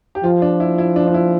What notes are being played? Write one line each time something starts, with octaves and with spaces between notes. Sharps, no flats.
G4
F3 F4
D4
E4
E4
D4
D4
E4